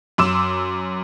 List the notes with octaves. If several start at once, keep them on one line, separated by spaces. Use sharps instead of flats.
F#2 C6 D6 E6 E7